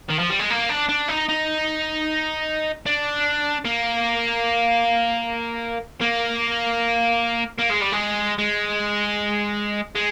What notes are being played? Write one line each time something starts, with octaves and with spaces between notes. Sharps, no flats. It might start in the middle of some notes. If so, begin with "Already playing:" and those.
D#3
F3
G3
G#3
A#3
D4
D4
D#4
D#4
D4
A#3
A#3
A#3
G#3
G3
G#3
G#3
G#3